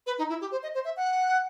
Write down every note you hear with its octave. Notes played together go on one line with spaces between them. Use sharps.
B4
D#4
E4
G4
C5
D#5
C5
E5
F#5